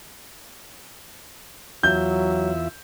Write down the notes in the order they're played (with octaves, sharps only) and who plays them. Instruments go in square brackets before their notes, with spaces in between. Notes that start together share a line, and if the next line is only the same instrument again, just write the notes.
[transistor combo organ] E2 F4 E5 [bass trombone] F#3 [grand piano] G6